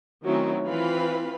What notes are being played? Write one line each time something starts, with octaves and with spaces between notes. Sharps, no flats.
D#3 F#3 A3 C4 C#4 E4
E3 C4 F4 B4 F5 B5